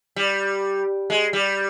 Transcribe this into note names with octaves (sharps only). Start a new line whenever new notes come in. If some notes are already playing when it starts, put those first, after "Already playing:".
G3
G#3
G3